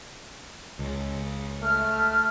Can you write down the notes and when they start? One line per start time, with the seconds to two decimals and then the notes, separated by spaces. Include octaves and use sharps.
0.79 C#2
1.61 A3 F6